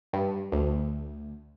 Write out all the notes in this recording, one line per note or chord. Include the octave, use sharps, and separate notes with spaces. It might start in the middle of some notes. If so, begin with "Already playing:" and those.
G2
D2